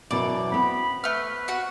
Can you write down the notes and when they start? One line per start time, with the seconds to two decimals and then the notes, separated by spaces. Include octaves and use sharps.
0.11 F#2 B2 E3 D5
0.52 B3 C4 B5
1.04 A3 B4 F6
1.48 F#4 F#5